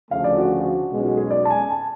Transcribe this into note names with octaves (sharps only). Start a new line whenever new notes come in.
D2 C#3 F3 A3 F5
D5
F#4
B1 B2 G#3 C#4
F#4
G#4
D5
A5
G#5
A5